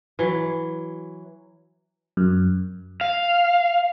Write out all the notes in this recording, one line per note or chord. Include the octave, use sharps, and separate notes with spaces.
E3 F#3
F#2
F5